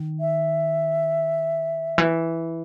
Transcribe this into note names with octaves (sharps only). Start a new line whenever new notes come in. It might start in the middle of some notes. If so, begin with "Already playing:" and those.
Already playing: D#3
E5
E3